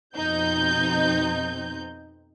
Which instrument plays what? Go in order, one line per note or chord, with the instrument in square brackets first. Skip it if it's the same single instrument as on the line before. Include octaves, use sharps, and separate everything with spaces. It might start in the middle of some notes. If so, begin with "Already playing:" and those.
[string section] F2 B2 F3 C4 D#4 G6